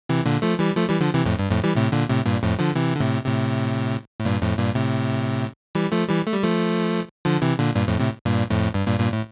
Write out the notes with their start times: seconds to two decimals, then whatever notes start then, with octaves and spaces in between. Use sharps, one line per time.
0.09 C3 E3
0.26 A#2 D3
0.42 F3 A3
0.59 E3 G3
0.76 F3 A3
0.89 E3 G3
1.01 D3 F3
1.14 C3 E3
1.26 F2 A2
1.39 G2
1.51 F2 A2
1.63 E3 G3
1.76 A2 C3
1.92 A#2 D3
2.09 A2 C3
2.26 G2 A#2
2.42 F2 A2
2.59 D3 F3
2.76 C3 E3
2.96 D3
3.00 A2 C3
3.26 A2 C3
4.19 A2
4.25 G2 A#2
4.42 F2 A2
4.59 G2 A#2
4.75 A2 C3
5.75 E3 G3
5.92 F3 A3
6.09 E3 G3
6.26 A3
6.34 G3
6.43 F3 A3
7.25 D3 F3
7.42 C3 E3
7.58 A#2 D3
7.75 G2 A#2
7.87 F2 A2
7.99 A2 C3
8.25 G2 A#2
8.50 F2 A2
8.74 G2
8.87 G2 A#2
8.99 G2 A#2
9.12 A2